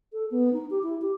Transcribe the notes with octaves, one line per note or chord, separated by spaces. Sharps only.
A4
B3
D#4
G4
E4
G4